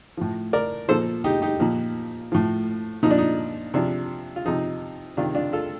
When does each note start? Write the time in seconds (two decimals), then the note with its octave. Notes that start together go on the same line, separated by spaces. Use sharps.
0.17 A2 F3
0.53 A#4 D5
0.88 A#2 F3 A4 C5
1.24 D#4 G4
1.42 D#4 G4
1.60 A#2 F3
2.32 A2 F3
3.03 A#2 F3 D#4
3.11 D4
3.18 D#4
3.74 C3 F3 D4
4.36 F4
4.45 C3 F3 D#4
5.17 C3 D#3 D4 F4
5.35 D4 F4
5.53 F4 A4